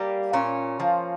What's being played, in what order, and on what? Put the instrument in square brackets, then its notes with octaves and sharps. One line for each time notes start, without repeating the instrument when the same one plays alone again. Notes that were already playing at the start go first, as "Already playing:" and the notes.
Already playing: [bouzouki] G3 A#3
A#2 C#4
F3 A#3